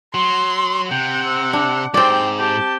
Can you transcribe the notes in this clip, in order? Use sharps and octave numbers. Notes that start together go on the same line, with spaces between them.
F#3 C6
C3 F#5 G5
C4
C4 D4
G#2 C4 G4 D5 G5
G4 A5